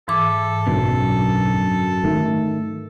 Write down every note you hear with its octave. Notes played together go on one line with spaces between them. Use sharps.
G#2 E3 A4 D6
B1 F#2 D3 B3
D#3 A3